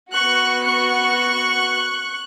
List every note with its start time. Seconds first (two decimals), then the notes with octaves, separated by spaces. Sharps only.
0.12 B3 F#4 C#6 F#6
0.63 C#6 F#6